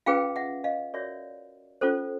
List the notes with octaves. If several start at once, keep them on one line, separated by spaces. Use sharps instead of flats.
C#4 F4 G#4 B4 F5 G5
E5 F#5
D#5 F5
F#4 A#4 C#5 D5 E5
C#4 F4 A4 C5